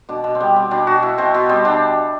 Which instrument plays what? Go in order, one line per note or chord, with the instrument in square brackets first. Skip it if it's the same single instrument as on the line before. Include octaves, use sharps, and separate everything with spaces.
[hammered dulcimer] B2 D4
B2
C4
G3 B3
G3 C4
B2 D4
B2 F#4
B3 E4
B2 C4
B2 B3
G3 C4
B2 D4